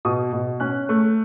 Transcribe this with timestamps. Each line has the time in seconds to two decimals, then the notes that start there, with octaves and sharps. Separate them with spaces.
0.05 B2 D#6
0.33 B2
0.60 C#4 F#6
0.89 A3